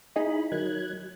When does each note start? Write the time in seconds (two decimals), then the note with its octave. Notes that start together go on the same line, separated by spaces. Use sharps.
0.16 D#4 E4 G#4 D#5 B5
0.52 D#3 F#3 F#6 G#6